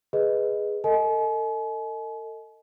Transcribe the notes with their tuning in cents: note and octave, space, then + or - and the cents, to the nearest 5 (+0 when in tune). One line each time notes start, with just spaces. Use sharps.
G#4 +0 B4 +0 D#5 +0
A4 +40 D#5 +15 G#5 +45